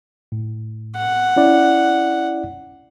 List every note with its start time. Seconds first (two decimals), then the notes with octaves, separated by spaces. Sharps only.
0.32 A2
0.97 F#5
1.36 C#4 E4 D5